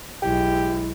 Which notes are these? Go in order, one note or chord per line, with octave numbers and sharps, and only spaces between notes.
B1 G#3 E4 G4